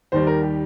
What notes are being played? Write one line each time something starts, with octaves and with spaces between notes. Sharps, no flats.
D#2 D#3 G3 C5
A#4
G4